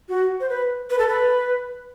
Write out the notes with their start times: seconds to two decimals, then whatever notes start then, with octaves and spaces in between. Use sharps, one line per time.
0.09 F#4
0.40 C5
0.50 B4
0.90 B4
0.99 A4
1.09 B4